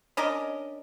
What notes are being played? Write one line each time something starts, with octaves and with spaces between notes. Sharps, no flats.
C#4 D4 A#4 D#5